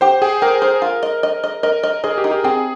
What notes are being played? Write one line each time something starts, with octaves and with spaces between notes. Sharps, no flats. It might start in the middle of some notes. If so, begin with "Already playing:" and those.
G4 C5
G4 G#4
G4 A#4
C5
F4
D#5
D#5
D#5
A#4 D#5
D#5
G#4 D#5
G4
D#4
G4
C4 G#4